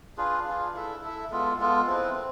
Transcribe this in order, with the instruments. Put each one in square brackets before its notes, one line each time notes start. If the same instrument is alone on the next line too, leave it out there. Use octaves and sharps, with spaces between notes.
[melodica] D4 F4 G#4 B4
D4 F4 G#4 B4
E4 A4 E5
E4 A4 E5
G#3 B3 F4 A4
G#3 B3 F4 A4
C4 E4 B4
C4